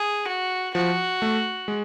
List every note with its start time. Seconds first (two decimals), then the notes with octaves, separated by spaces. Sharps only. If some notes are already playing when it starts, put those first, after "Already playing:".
Already playing: G#4
0.27 F#4
0.75 F3 F#4
1.22 A3
1.68 G#3